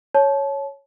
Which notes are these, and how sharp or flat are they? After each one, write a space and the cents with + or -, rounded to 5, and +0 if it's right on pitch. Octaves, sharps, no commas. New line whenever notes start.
C#5 +0 A5 -30